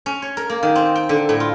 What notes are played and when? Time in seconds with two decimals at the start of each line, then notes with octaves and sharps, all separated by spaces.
0.06 C#4
0.22 C#5
0.37 A#4
0.50 A#3
0.63 D#3
0.75 C4
0.96 G5
1.09 D3
1.29 A2
1.40 F4